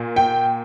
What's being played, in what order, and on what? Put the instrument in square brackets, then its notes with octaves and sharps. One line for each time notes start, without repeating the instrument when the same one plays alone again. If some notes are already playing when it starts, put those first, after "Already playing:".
Already playing: [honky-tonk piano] A#2 A#3
G5